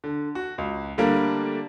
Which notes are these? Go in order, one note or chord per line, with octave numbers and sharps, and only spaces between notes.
D3
F#4
C#2
D3 G3 A3 A#3 D4 A#4